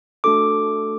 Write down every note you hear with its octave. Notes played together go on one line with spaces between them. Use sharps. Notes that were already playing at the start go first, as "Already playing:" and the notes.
A3 D4 F#4 A4 D6